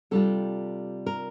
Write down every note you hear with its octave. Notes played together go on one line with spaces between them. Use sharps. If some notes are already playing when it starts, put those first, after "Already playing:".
C3 G3 D4 F4 A4
A#4